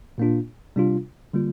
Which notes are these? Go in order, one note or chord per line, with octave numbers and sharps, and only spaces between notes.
A#2 A#3 D4 F4
C3 G3 D4 F4
D3 G3 A#3 F4